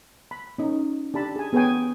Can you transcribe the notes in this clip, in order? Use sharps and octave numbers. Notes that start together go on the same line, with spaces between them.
B5
C#4 D#4
D4 G4 A5 B5
G#4 G#5
B3 G#4 B4 C#5 G5 G#5